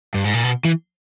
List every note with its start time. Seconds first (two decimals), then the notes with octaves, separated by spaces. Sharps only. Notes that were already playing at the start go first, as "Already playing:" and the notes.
0.14 G2
0.24 G#2
0.34 A#2
0.44 B2
0.65 E3